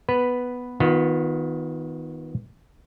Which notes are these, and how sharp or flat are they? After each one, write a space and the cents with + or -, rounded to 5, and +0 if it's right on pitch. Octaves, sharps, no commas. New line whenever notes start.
B3 +0 B4 +0
D#3 +20 B3 +0 F4 +40